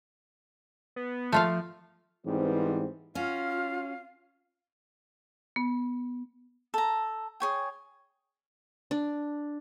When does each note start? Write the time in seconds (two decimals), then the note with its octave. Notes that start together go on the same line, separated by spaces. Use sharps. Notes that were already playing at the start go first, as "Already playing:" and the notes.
0.96 B3
1.32 F3 A3 F4 F5
2.25 G#2 E3 G3 B3 C4
3.15 C#4 F4 F#4 F5
5.56 B3
6.74 A4 A#5
7.40 G#4 C#5 G5
8.91 D4